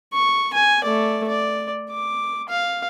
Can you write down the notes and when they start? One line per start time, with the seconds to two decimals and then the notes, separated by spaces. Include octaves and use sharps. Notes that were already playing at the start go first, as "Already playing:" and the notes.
0.13 C#6
0.54 G#5
0.84 A3 D5
1.28 D5
1.90 D6
2.49 F5